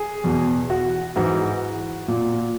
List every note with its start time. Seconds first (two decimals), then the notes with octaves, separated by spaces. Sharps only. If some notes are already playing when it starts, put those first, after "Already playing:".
Already playing: G#4
0.24 E2 B2
0.70 F#4
1.16 G#2 E3 F#4
2.08 A#2